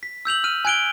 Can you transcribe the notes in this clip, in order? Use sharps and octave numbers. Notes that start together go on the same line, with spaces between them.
B6
E6 G6 F7 F#7
F6 D#7
G#5 F#6 G#6 D7 F7 G7